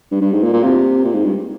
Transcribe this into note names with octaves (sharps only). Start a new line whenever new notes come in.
G2
G2
G#2
A#2
A#2
C3
A#2
G#2
G2